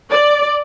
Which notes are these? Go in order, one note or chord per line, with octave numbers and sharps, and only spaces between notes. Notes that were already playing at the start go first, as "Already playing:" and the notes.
D5